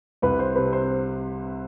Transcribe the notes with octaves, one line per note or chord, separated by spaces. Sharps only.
C2 B4
C5
C3 B4
C5